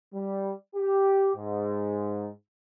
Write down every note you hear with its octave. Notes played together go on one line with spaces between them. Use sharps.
G3
G4
G#2